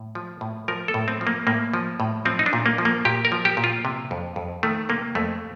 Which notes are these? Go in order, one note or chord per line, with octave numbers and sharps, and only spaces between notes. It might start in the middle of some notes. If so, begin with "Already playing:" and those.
Already playing: A2
F3
A2
F3 A#4
A4
A2
C4
F3
A#3
A2 A#3
F3
A2
F3 C4
D#4
D4
A#2
A#3
F3
A#3
A#2 G4
A#4
F3
G4
A#2
F4
C3
F2
F2
D#3 A3
C3 A#3
F2 A3